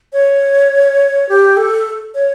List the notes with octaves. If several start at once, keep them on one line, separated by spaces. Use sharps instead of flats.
C#5
G4
A4
C#5